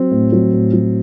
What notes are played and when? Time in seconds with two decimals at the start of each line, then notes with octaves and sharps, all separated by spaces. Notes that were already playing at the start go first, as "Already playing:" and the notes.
Already playing: F#3 C4
0.11 A2
0.32 F#3
0.53 A2
0.73 F#3